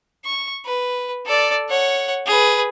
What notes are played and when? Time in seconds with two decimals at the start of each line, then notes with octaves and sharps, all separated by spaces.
0.25 C#6
0.65 B4
1.26 A4 D5
1.69 C#5 F#5
2.26 G#4 B4